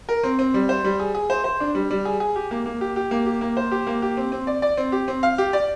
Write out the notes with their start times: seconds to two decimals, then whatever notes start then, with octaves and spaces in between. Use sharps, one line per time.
0.09 A#4
0.23 C4
0.39 C4
0.54 G3
0.69 C5
0.84 G3
1.00 G#4
1.15 G#4
1.30 C5
1.44 C5
1.60 D4
1.75 G3
1.91 G3
2.05 G#4
2.20 G#4
2.36 G4
2.51 A#3
2.66 A#3
2.81 G4
2.96 G4
3.11 A#3
3.26 G4
3.41 A#3
3.57 C5
3.71 G4
3.87 A#3
4.02 G4
4.17 C4
4.32 C4
4.47 D5
4.62 D5
4.77 C4
4.92 G4
5.08 C4
5.23 F5
5.38 G4
5.53 D5